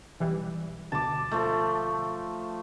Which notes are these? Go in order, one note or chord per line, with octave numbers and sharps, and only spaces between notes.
B1 E3 G3
D2 B2 A5 D6
F3 A3